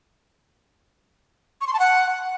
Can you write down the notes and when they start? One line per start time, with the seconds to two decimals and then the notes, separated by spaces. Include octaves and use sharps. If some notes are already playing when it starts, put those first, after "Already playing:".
1.61 C#6
1.67 C6
1.73 A5
1.80 F#5